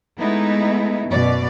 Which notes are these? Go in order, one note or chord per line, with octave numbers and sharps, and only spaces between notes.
G#3 A3 B3 D#4 E4
F#2 B2 D5